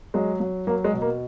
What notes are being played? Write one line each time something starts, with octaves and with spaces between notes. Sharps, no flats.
F#3 G#3
F#3
F#3 A#3
G#3
B2
A#3